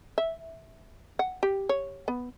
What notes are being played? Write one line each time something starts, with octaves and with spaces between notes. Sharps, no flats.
E5
F#5
G4
C#5
B3